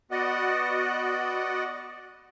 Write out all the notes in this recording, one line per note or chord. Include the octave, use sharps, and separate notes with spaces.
B3 F#4 D5 D#5 F#5